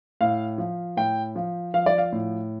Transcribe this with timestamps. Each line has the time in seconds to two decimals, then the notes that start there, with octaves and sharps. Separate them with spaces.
0.21 A2 F5
0.58 F3
0.97 A2 G5
1.36 F3
1.74 F3 F5
1.86 D5
1.98 F5
2.12 A2